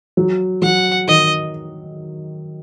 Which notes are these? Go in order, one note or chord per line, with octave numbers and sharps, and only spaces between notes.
F#3
F#3 F#5
D#3 D#5